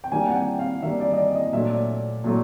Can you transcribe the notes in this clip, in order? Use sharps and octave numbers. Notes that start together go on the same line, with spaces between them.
G5
D#3 G3 A#3 D4 G#5
F#5
G5
F5
D#3 G3 A#3 D4 E5
D5
D#5
D5
D#5
A#2 F#3 A3 D4 E5
A#2 F#3 A3